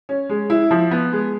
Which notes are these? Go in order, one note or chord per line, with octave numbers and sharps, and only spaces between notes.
C#4
G#3
E4
F3
B3
G#3